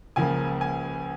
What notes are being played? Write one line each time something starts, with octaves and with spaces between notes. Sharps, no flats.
C#2 C#3 F3 A#3 G#5
G#5